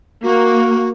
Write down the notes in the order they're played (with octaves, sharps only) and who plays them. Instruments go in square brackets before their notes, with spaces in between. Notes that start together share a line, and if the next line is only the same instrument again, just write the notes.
[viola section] A#3 [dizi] F#4